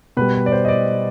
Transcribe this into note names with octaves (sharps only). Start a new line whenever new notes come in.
B2 G3 B4
B4
D5
C5
D#5
D5